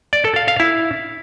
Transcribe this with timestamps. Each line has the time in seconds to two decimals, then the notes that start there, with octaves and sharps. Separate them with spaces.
0.13 D5
0.24 A4
0.36 F5
0.48 F5
0.60 E4